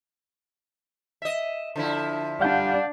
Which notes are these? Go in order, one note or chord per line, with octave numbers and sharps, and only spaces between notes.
D#5 E5
D3 F3 E4
G3 D4 F5 F#5 G6